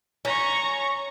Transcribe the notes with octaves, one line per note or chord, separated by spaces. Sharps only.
C#4 A#5 C#6